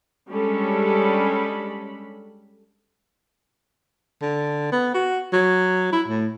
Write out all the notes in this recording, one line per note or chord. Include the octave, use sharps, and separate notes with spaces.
G3 G#3 C#4 D4 A4 B5
D3
B3
F#4
F#3
E4
A2